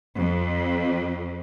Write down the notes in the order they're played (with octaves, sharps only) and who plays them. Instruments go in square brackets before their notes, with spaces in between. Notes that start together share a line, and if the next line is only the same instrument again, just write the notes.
[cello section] F2